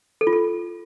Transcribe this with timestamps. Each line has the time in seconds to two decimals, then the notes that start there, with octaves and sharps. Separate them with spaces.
0.21 A4
0.27 F4
0.33 A4